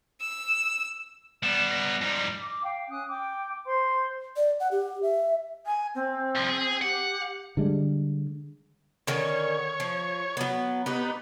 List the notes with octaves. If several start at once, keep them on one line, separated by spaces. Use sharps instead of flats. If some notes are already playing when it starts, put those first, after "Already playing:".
E6
G3 B3 E7
A#6
G#2 G3
D6
F5 G5
C#4 D#6 F#6
G5 D6
C5 C6
D5
F#5
G4
E5
G#5
C4
C2 F3
G#4
G4 F#5
D3 G3 G#3
D3 D#3 C#4 C#5
F3
F#3 B3
B3 D#4 G4